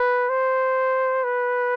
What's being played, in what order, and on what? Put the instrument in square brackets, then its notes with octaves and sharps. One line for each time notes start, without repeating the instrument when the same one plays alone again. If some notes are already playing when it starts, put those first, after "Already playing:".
Already playing: [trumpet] B4
C5
B4